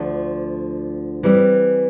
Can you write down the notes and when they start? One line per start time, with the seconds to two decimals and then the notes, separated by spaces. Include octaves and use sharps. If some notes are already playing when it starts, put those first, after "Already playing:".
Already playing: D2 D3 F3 A3 D4
1.23 E3 G3 C4